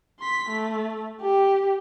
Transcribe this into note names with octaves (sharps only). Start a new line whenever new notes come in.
C6 B6
A3
G4